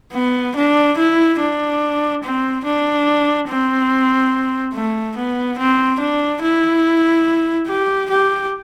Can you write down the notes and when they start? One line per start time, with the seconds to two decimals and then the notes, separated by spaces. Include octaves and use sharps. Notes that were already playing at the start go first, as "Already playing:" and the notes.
0.13 B3
0.56 D4
0.97 E4
1.40 D4
2.23 C4
2.64 D4
3.48 C4
4.74 A3
5.16 B3
5.58 C4
6.00 D4
6.42 E4
7.67 G4
8.10 G4